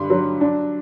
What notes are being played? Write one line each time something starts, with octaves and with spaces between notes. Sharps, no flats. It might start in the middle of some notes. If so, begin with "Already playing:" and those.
Already playing: G2 D3 B5 C6
F#3
D4